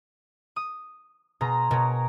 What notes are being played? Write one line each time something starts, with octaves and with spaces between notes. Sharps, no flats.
D#6
B2 G#4 A#5 C6
B2 A#4 C#5